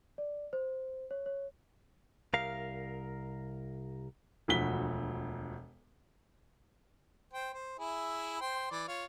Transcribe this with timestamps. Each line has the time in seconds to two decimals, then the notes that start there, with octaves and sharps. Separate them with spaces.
0.18 D5
0.53 C5
1.11 C#5
1.26 C#5
2.33 C2 A#4 F5
4.48 E1 D2 F3 F#4 B6 G7
7.33 C5 G5
7.54 C5
7.79 E4 G#4 E5
8.41 C5 G5 C6
8.71 E3 D5
8.88 F4 C#5